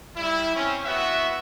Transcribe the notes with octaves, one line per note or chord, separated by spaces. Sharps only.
G3 E4
C4 C#4
B3 E4 F#4 E5 F#5